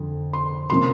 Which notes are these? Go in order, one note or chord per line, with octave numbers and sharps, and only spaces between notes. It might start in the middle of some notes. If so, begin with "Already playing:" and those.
Already playing: F2 D3
C6
C3 F3 A#3 C#4 C6